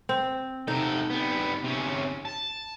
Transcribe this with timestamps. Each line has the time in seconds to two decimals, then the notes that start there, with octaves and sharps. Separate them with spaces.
0.09 C4
0.68 C3 D#4 A4
1.10 G3 B3
1.64 C3 C#4
2.25 A5